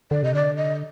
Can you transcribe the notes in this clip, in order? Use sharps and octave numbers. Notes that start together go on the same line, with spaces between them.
D3 D5
C3 D#5
D3 D5
D#5